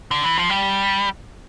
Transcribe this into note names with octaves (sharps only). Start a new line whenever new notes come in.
D3
E3
F3
G3